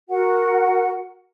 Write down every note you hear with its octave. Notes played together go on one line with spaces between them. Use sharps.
F#4 A#4 F#5